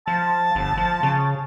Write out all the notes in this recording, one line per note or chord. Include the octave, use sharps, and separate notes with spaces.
F3 A5
G1
F3
C#3